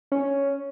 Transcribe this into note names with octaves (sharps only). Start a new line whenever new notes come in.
C#4